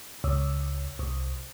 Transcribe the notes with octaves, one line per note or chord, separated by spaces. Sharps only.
C#2
C2